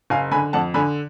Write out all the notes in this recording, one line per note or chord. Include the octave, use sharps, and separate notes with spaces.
F#1 F5 G#5
D3 G#5 B5
F2 F#5 A5
D3 G#5 B5